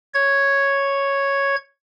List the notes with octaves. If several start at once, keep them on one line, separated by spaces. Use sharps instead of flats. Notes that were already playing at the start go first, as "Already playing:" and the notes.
C#5 G#6